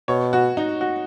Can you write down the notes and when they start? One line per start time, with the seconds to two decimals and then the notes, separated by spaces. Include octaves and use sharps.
0.08 B2 C#5
0.33 F#4
0.57 D#4
0.81 F#4